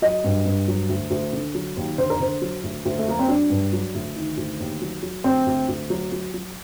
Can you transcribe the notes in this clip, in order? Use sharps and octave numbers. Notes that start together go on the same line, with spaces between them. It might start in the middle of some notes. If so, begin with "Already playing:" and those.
F#3 D#5
G2
G2
F#3
D2
D2
D3
F#3
D#2
D3 C5
A#4
D3 C5
F#3
D2
D2
A3
F#3 A#3
C4
F#3 D4
G2
F#3
D2
D#3
D2
D#2
F#3
F#3
D2 C4
D2
D2
F#3
F#3
F#3